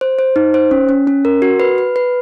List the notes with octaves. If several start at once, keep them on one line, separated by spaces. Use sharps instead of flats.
C5
C5
D#4
C5
C#4
C#4
C#4
A#4
F#4
B4
B4
B4